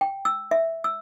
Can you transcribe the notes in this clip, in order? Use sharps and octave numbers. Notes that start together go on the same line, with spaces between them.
G5
E6
E5
E6